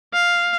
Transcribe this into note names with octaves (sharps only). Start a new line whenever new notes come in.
F5